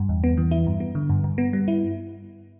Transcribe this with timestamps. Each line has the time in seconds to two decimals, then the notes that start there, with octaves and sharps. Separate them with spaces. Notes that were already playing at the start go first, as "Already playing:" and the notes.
Already playing: G2
0.09 E2
0.24 B3
0.38 E3
0.51 E4
0.67 G2
0.80 B3
0.95 D3
1.10 G2
1.24 G2
1.38 B3
1.53 G3
1.68 E4